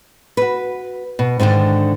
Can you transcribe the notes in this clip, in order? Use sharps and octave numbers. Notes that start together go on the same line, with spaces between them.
F#4 B4
B2
G#2 D3 D#3 D4